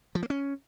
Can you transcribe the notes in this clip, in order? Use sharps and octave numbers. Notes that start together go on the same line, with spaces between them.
F3
A#3
C#4